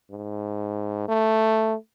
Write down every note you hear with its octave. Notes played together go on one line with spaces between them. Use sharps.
G#2
A3